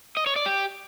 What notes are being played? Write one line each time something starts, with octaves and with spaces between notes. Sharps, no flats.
D#5
C#5
D5
G4